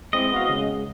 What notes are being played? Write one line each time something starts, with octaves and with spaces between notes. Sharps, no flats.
G#3 C4 E4 D#5
B3 F#4 F5
C#3 G#3